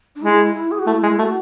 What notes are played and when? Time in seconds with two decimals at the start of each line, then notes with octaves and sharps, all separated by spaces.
0.15 D4
0.22 G#3 E4
0.54 E4
0.71 G#4
0.79 F#4
0.87 A3 E4
1.03 G#3
1.19 A3 F#4